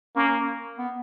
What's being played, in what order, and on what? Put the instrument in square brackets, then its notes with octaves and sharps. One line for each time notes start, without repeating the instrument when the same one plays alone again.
[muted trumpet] A#3 [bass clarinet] C#4
[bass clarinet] B3